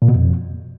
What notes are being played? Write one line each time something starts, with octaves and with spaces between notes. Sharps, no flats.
A#2
B2
F2